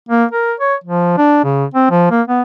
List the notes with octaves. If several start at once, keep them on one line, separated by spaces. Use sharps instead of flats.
A#3
A#4
C#5
F3
D4
C#3
C4
F3
A#3
B3